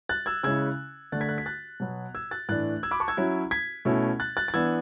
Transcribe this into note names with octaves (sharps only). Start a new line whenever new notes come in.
F#6 A6
E6 G#6
C#3 G#3 C#4 E4 E6 G#6
D3 A3 D4 F#6 A6
G#6 B6
F#6 A6
G#6 B6
F#6 A6
B2 F#3 B3
E6 G#6
F#6 A6
A2 E3 A3 D4 F#6 A6
E6 G#6
B5 D6
A5 C#6
E6 G#6
F#3 C#4 E4
G#6 B6
B2 A3 C#4 E4
F#6 A6
F#6 A6
A6
E3 B3 D4 E6 G#6